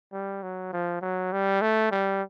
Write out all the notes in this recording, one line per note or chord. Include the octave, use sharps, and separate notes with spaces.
G3
F#3
F3
F#3
G3
A3
G3